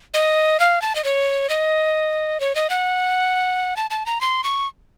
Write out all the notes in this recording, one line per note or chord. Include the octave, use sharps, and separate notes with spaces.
D#5
F5
A5
D#5
C#5
D#5
C#5
D#5
F#5
A5
A5
A#5
C6
C#6